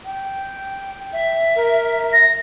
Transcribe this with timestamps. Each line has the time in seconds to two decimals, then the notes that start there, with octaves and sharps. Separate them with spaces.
0.05 G5
1.13 E5
1.55 A#4
2.13 A#6